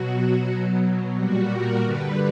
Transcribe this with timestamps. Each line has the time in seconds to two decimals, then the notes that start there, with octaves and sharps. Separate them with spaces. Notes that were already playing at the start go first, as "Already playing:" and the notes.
Already playing: B2 F#3 F#4
0.48 B2 F#3
1.15 A#2 G3 F#4
1.49 A#4
1.82 G2 D3 G3 B4